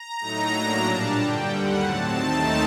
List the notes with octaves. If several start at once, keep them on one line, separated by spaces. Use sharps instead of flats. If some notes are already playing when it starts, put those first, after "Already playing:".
Already playing: A#5
A2 F#3 A3 D#4
A2 F#3 A#3 D4 A#5
A#2 G3 D4 A5
G2 D3 G3 G5
D#2 D3 G3 F#5
A2 F#3 C4 A5
D#2 D#3 A3 C4 D#4